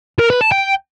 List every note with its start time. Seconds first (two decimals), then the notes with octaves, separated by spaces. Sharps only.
0.19 A#4
0.30 B4
0.41 A5
0.52 G5